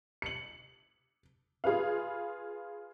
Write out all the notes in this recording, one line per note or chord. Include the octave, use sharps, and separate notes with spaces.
C#7 F#7
F4 G#4 B4 F5